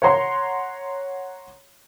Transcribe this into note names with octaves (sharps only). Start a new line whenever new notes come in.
C#5 F#5 A#5 C6